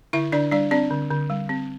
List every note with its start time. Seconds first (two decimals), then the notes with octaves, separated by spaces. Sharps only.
0.13 D3 E4 E5
0.32 D3 D4 D5
0.51 G3 D4 D5
0.71 C4 D4 D5
0.91 D3
1.11 D3
1.30 G3
1.49 C4